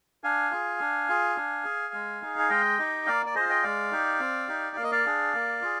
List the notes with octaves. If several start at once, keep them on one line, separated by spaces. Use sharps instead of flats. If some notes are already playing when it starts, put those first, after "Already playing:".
D4 F5 G#5
F4 G#4
D4
F4 G#4
D4
G#4
G#3
D#4 G#4
G#5
G#3 D#5 G5
D#4 G4
A#3 D5 F5
D5
F4 G#4 C5 D#5
D#5 G5
G#3 D5 F5
D#4 G4
C4
D#4 G4
A#3 F5
D#5
D5 F5
D4 G#4
A#3
F4 G#4